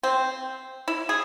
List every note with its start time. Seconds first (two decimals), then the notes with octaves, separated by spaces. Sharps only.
0.03 C4
0.88 E4
1.09 G#4